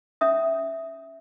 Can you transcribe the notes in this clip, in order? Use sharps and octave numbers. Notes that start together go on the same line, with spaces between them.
C#4 E5 D#6